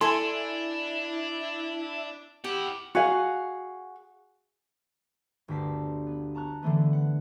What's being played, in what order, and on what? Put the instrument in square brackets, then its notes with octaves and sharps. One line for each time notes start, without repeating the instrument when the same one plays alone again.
[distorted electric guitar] D4 [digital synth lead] E4 [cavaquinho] A4 G#5 [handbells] C6
[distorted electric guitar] E4 F#5 [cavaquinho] G4
[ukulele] F#4 G#4 F5
[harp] G1 D2 G4 A5 B6 C7
B3
A5 A#5 C#6 F#6
D3 E3 A3 B3
F#5